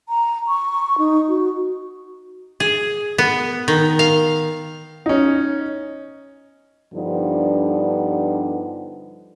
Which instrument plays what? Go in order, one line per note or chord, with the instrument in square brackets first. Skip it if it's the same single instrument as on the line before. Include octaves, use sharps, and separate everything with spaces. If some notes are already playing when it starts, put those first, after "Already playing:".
[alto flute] A#5
C#6
D#4
F#4
[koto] G#4
B3
D#3
F5
[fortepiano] C#4 D#4
[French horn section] G2 D3 F3 G3 B3 D#4